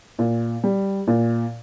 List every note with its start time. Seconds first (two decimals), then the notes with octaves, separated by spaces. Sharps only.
0.19 A#2
0.64 G3
1.07 A#2